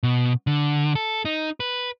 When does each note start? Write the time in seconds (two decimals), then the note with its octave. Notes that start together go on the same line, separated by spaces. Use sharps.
0.03 B2
0.47 D3
0.95 A4
1.25 D#4
1.60 B4